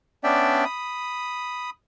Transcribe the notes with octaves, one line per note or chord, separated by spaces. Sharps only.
B3 C#4 D4 D5 E5 G5
B5 D#6